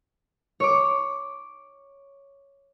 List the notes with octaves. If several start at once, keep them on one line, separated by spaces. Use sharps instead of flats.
C#5 D6